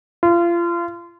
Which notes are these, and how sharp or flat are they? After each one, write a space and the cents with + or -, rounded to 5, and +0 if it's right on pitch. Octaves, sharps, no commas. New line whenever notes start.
F4 -30